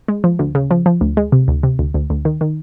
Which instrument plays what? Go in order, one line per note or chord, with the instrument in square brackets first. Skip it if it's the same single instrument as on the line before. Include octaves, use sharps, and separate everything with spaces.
[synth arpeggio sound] G#3
F3
D2
C#3
F3
F3
D2
G#3
C3
D2
C3
D2
D2
D2
D#3
D#3